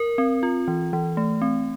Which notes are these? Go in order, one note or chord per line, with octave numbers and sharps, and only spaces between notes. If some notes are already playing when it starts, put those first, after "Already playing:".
Already playing: A#4
C4
F4
E3
E3
A3
C4